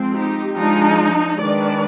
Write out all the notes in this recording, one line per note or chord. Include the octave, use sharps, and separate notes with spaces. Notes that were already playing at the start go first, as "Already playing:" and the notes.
Already playing: F3 G#3 C4
D#4 G4
F3 G#3 D4 D#4
D#3 G#3 D4 B4 D5